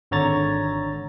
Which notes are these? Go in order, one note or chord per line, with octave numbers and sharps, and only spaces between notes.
G#1 D3 A4 C#5 A#5 A6